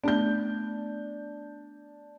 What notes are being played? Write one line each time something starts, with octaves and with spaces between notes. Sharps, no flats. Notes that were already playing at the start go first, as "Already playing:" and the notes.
A3 B3 D4 G6